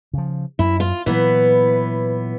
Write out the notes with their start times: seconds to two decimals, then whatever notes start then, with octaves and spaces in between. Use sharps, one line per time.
0.14 C#3 F3
0.59 F#2 E4
0.80 F4
1.06 A#2 E3 F#3 B3